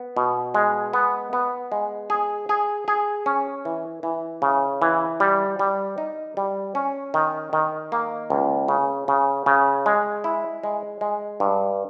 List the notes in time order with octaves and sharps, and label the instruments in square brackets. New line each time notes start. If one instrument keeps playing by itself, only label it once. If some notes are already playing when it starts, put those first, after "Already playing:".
Already playing: [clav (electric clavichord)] B3
B2
G#3
B3
B3
G#3
G#4
G#4
G#4
C#4
E3
E3
C#3
E3
G3
G3
D#4
G3
C#4
D#3
D#3
A#3
C#2
C#3
C#3
C#3
G#3
E4
G#3
G#3
G2